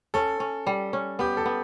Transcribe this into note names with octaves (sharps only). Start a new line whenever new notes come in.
C#4 A4
C#4
G3
C#4
B3 G4
A4
B3